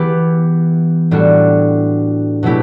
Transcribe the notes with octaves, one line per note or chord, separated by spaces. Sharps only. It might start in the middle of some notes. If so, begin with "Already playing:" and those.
Already playing: E3 B3 E4 G4
A2 G3 D4 F#4
B2 F#3 A3 E4 G4